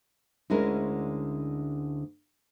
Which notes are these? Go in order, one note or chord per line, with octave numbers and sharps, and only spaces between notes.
D2 D3 G#3 C#4 E4 A#4